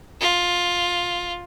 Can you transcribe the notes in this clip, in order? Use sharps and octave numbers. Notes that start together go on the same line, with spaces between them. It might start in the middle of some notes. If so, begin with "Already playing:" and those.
F4